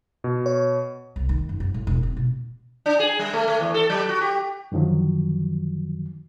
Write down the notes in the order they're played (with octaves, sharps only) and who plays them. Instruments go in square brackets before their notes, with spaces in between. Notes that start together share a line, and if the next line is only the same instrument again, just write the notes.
[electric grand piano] B2
[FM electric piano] C#5
[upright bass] C2
D#3
F#2
F#2
A2
E1
C4
B2
[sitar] D4
G#4
G3
A3
A3
E2
A4
F#3
F#4
G4
[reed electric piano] F#2 D3 D#3 F3 F#3